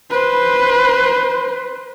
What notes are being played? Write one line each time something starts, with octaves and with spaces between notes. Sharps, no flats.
B4 C5